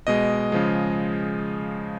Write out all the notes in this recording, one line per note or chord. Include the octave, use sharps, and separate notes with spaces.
B2 G#3 D#5
C#3 F3 G#3